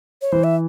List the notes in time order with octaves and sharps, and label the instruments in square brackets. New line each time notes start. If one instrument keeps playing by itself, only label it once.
[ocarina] C#5
[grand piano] E3 [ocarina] C5
[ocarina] E5